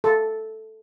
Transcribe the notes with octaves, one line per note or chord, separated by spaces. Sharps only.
A4